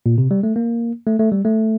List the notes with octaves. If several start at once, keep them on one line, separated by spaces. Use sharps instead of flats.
A#2
C3
G3
A3
A#3
A3
A3
G3
A3